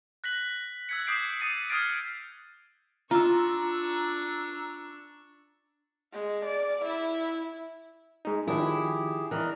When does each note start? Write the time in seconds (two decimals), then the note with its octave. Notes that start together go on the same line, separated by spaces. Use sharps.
0.24 F#6 A#6 B6 F#7
0.89 E6 F#6 G#6 B6 C#7
1.07 D6 D#6 G6 C7 D7
1.41 D#6 E6 A6 B6 C#7 D#7
1.70 D#6 F6 G#6 A6 C7 D7
3.11 D4 F4 A#5 C#6 E6
6.13 G#3
6.45 D5
6.84 E4
8.25 G#3 D#4
8.47 D#3 F3 D4 E4 G4 G#4
9.31 E3 D4 A#4 D#5 F#6